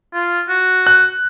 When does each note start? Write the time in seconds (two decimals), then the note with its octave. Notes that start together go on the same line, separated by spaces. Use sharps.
0.14 F4
0.49 F#4
0.87 F#6